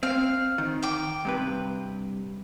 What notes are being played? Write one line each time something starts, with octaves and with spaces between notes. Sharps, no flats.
C4 F5
D#3
G5 D6
G2 C3 B4